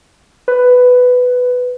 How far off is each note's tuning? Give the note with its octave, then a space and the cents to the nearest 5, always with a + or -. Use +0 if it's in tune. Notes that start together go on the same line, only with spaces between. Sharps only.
B4 +10